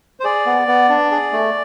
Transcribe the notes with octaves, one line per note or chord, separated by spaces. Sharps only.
C5
G#4 D5
B3
B3
D4
G#4
A3